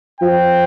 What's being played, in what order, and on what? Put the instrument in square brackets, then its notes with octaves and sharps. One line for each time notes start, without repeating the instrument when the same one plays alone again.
[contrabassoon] F3 [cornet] G5